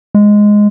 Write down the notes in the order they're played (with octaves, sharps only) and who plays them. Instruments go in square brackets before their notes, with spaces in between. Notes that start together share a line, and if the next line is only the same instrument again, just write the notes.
[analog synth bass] G#3